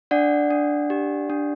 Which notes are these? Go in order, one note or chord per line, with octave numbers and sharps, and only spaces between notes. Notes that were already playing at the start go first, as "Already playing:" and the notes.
D4 D5 F#5
D4
G4
D4